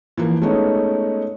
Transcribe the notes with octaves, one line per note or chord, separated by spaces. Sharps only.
E3 F3 A#3
G#3 A3 B3 C#4 D#4